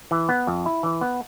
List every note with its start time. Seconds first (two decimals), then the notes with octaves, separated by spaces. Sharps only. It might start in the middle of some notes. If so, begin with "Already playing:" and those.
0.11 E3
0.29 B3
0.47 F2
0.66 E4
0.83 E3
1.01 B3